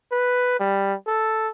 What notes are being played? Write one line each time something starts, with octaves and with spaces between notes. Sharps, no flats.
B4
G3
A4